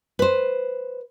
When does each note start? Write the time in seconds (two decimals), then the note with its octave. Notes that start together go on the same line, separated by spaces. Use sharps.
0.19 B4 C5